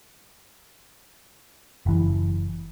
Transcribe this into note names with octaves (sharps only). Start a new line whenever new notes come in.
F#1 E3